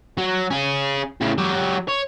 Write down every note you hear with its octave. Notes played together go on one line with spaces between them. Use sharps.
F#3
C#4 G#4
A2 C#3
F#3 G4
C#5